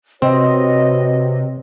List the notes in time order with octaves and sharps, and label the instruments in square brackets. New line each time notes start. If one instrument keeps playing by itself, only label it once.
[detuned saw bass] C3 [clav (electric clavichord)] C4 [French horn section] F#4 B4 C#5 [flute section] D#5